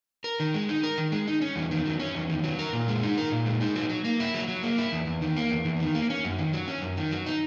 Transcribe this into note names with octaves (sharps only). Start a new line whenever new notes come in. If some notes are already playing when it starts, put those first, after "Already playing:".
A#4
D#3
G#3
D#4
A#4
D#3
G#3
D#4
C#4
E2
D#3
F#3
C#4
E2
D#3
F#3
A#4
A#2
G#3
D#4
A#4
A#2
G#3
D#4
F#3
F#3
A#3
E4
F#3
F#3
A#3
E4
E2
E2
D#3
A#3
E2
E2
D#3
A#3
C#4
F#2
D#3
F#3
C#4
F#2
D#3
F#3
D#4